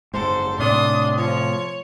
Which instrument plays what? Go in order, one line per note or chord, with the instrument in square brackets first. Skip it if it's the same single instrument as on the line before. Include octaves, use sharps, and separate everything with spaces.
[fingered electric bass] F#1 G#2 [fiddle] A4 [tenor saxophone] C5
[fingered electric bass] A2 C3 A3 [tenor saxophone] D4 [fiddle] C6 D#6
[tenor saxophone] F3 [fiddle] C#5